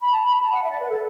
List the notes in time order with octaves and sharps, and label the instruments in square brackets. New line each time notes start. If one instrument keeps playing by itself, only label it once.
[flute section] B5
A5
B5
A5
F#5
E5
D5
B4
A4